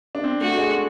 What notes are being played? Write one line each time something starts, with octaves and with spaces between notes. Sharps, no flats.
D4
C4
A3 F#4
G#3